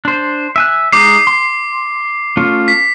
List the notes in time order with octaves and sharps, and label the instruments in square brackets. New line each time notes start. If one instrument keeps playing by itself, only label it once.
[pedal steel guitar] D4 C5
E5 G#5 F#6
[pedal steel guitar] G#3 D#4 [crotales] D6 C7
[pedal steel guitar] C6
A3 C#4 F4
[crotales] B6